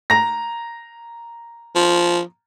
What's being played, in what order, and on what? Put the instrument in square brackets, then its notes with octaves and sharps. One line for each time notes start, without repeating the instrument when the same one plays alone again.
[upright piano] A#5 A#6
[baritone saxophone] F3